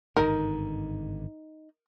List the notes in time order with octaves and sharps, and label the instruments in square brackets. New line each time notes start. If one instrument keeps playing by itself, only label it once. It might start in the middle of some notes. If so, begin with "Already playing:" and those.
[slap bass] G#1 G2 D3 [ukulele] D#4 [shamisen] A#4